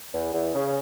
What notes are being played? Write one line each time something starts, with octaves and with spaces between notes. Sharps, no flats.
E2
E2
C#3